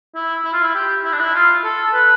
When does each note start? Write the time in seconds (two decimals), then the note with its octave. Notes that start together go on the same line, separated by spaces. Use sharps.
0.15 E4
0.45 E4
0.53 F4
0.62 E4
0.75 G4
1.05 E4
1.13 D4
1.20 E4
1.35 F4
1.64 A4
1.94 B4